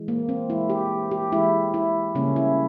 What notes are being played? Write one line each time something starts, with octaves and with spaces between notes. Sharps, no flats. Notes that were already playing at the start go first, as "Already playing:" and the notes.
Already playing: E3 G#3
A#3
C4
E3 G#3 E4
G4
G4
E3 G#3 E4
E4
C#3 G3 A#3 C#4
E4